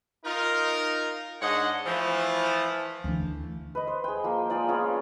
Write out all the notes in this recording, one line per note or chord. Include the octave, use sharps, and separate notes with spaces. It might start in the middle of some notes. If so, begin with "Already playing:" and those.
D#4 F4 A#4
G#2 D4 C#5 D#5 F#5
E3 F3 A3
D2 E3
B4 D#5
C5
G#4 G5
F3 A#3
G#3 F4 D5 G5
B3 C#4 F4